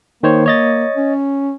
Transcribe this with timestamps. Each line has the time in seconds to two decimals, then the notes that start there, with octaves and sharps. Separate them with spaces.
0.23 D#3 A#3 C5 C#5
0.46 C#5 D#5 A6
0.95 C#4